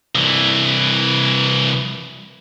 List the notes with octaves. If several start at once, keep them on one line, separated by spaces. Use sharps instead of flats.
C2 E3